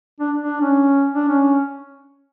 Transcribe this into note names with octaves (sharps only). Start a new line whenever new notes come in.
D4
D4
C#4
D4
C#4